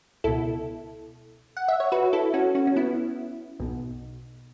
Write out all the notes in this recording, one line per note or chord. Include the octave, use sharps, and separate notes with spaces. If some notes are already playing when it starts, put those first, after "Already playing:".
C#2 B2 E4 A4
F#5
E5
C#5
F#4 B4
E4 A4
C#4 F#4
C#4 F#4
C#4
B3 E4
B1 B2